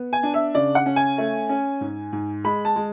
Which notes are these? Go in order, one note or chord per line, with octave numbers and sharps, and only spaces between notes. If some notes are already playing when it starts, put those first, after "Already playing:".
Already playing: B3
G#5
D4
E5
C#3 D5
F#5
C#4
G#5
A3
C#4
G#2
G#2
G#3 B5
A5
G#3